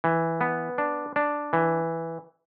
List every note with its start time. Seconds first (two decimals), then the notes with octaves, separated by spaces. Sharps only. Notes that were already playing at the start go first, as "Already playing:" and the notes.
0.04 E3
0.41 B3
0.78 D4
1.16 D4
1.53 E3